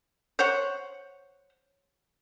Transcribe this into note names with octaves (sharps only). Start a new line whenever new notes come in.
C5 C#5 F#5